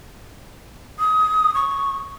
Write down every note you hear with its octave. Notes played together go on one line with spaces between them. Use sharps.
D#6
C#6